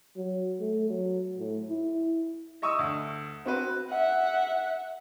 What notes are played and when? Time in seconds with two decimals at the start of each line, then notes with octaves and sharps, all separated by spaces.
0.16 F#3
0.60 A3
0.90 F#3
1.39 A2
1.70 E4
2.62 D#5 E5 C#6 D#6 E6
2.79 D2
3.46 C4 F#4 B4
3.90 E5 F#5